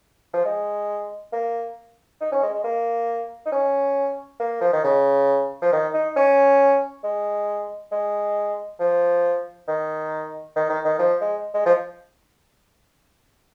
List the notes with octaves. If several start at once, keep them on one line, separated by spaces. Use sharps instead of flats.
F3
G#3
A#3
D#4
C#4
G#3
G#3
A#3
D#4
C#4
A#3
F3
D#3
C#3
F3
D#3
D#4
C#4
G#3
G#3
F3
D#3
D#3
D#3
D#3
F3
G#3
G#3
F3